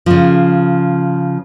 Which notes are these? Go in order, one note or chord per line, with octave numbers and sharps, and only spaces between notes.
C#3 F3